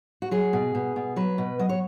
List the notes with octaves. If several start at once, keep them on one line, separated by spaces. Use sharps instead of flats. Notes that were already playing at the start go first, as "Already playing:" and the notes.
F#4
F#3 G#4
B2
B2
B2
F#3 B4
B2
F#3 D#5
C#5